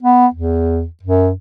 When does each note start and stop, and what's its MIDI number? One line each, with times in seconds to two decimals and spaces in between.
0.03 0.27 59
0.34 0.85 40
1.03 1.32 42